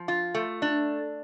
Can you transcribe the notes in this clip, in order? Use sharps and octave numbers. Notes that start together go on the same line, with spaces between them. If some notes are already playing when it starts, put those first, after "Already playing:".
Already playing: F3
F4
A3
D4